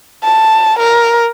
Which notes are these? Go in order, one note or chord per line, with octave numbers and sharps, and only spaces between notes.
A5
A#4